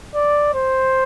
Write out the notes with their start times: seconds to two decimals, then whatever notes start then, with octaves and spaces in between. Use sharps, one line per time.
0.15 D5
0.54 C5